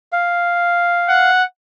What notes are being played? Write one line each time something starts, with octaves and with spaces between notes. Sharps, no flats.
F5
F#5